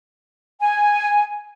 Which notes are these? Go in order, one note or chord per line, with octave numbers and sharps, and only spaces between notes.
G#5